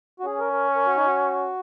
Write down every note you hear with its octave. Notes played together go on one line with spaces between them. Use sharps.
F#4
C#4 G#4
A#4
A#4
A#4
F#4
D#4
F#4